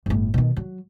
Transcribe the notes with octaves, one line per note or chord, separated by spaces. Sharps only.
G1 A2
B2 D#3
F#3